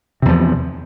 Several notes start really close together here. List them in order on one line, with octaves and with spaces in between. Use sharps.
C3 E2 F3